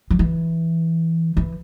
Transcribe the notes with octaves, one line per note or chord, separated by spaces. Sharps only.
F3
E3
E3